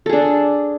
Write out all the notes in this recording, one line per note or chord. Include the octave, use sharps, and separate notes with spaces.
D4 G#4 A4